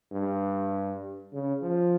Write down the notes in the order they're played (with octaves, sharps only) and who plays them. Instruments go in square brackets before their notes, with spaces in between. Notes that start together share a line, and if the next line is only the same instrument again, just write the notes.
[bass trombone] G2
C#3
F3